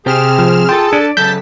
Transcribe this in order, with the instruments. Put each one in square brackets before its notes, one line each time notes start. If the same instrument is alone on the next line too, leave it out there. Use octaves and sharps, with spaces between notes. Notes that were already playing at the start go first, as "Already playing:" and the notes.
[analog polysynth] C3 F6 E7 [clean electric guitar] G4 C5 G5 [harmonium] G#4
[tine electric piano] F3
[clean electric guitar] F4 C6 [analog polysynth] A4 A5 [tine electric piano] G5
[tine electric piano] D4 [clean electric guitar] D5
[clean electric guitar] F#2 C#3 A4 [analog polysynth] A5 B6 [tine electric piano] G6